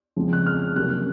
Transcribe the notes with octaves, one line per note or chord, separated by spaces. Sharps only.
C#3 F3 G#3 C4
F#6
F6
C3 F#3 A#3 C#4 F#6